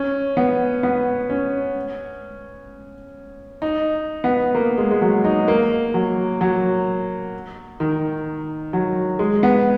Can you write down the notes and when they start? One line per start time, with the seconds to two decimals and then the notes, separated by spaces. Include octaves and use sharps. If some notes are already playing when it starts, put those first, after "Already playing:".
Already playing: C#4
0.37 B3
0.83 B3
1.30 C#4
3.62 D#4
4.24 B3
4.55 A#3
4.78 G#3
4.91 G#3
5.01 F#3
5.25 D#4
5.48 A#3
5.94 F#3
6.41 F#3
7.80 D#3
8.73 F#3
9.19 G#3
9.43 B3